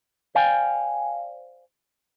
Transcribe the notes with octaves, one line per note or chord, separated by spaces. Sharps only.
C5 D5 F5 G5 G#5